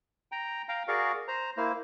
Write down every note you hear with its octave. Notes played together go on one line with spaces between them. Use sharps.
G5 A#5
F5 G5 A#5
F#4 G#4 A#4 D5 F5 C#6
C5 A#5
A#3 E4 C5